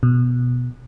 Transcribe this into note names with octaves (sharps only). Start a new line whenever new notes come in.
B2